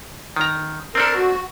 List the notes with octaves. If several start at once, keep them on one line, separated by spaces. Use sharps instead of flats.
D#3 A#5
C4 D4 A4 A#4
F#4